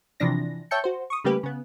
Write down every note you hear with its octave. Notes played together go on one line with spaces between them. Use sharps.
C3 E3 F3 D4 A#6
C#5 E5 G5 A5 G6 C#7
F#4 C5
C#6 D#6
C#3 G3 A3 A#3 G4 B4
C#3 B3